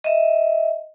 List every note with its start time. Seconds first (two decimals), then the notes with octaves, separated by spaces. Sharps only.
0.04 D#5 E5